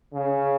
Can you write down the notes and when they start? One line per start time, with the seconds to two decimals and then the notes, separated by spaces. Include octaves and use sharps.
0.13 C#3